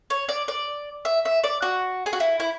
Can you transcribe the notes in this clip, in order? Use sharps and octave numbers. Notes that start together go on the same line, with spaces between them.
C#5
D5
D5
E5
E5
D5
F#4
G#4
F#4
E4
E4